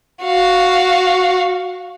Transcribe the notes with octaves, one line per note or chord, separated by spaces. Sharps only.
F#4 F5